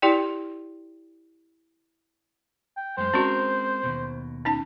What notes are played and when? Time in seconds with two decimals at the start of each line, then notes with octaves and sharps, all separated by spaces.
0.02 E4 G4 D5 G5
2.77 G5
2.98 F#2 G#3 C5
3.14 G#3 C4 C#4 F#4 A#4
3.83 D#2 G#2 B2
4.45 C#4 D#4 A5